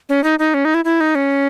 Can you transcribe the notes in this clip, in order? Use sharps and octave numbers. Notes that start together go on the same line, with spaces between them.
C#4
D#4
D#4
C#4
D#4
E4
E4
D#4
C#4